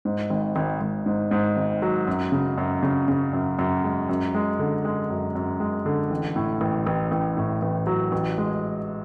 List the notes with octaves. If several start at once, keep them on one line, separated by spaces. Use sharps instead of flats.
G#2
G#1
G#1
G#1
G#2
G#2
G#1
F#3
F#2
C#3
F#2
C#3
C#3
F#2
F#2
G#3
F#2
G#3
D3
G#3
F#2
F#2
G#3
D3
A1
A2
A1
A1
A1
A2
A1
F#3
A1
G#3